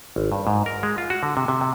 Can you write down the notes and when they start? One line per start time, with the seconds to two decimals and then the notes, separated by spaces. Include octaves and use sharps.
0.16 G#1
0.32 G2
0.47 G#2
0.66 A#4
0.83 G#3
0.98 F4
1.10 F#4
1.23 D3
1.37 C3
1.48 C3
1.61 C3